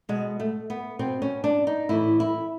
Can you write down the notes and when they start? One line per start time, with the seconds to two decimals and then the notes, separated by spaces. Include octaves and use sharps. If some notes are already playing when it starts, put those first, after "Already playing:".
0.09 B2 G#3
0.40 A3
0.70 B3
0.99 B2 C4
1.22 C#4
1.44 D4
1.67 D#4
1.89 A2 E3 E4
2.20 E4